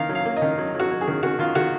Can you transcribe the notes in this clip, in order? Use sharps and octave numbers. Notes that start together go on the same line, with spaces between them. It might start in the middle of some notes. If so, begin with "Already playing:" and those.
Already playing: D#3 A#3 F5
F#3
F5
A#3
D#5
D#3
F#3
F#3 F#4
F#3
G#4
D#3
D#3 F#4
D#3 F4
D#3 F#4